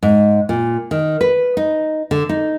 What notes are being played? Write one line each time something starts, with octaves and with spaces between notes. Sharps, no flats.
G#2
A#2
D#3
B4
D#4
D3
D#4